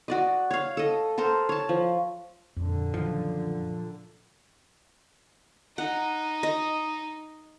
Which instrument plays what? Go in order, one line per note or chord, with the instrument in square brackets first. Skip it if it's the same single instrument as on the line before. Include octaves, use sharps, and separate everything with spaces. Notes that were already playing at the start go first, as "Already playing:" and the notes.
[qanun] F#4 D5 D#5
C#5 F5
A4 D#5
A4 A#4 C5
C#5 A5
F3
[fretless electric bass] F2 [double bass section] A#2 D3
[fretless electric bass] F#2 D#3 [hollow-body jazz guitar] F3
[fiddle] D#4 [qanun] F#5
[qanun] D#5